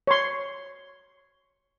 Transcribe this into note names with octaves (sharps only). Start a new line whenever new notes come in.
C#5 C6